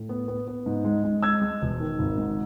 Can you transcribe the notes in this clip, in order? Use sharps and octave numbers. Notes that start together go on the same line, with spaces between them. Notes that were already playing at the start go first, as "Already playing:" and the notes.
Already playing: A2
B3
B3
B3
G#2
G#3
G#3
G#3 E6 G#6
G#3
E1
D#3
G#1
G#2